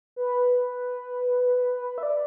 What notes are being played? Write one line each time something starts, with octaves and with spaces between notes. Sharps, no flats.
B4
E5
D5